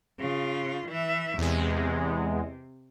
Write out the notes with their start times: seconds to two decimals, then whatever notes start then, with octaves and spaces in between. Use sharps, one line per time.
0.20 C#3 F4
0.88 E3 E5
1.38 E2 C3 G#3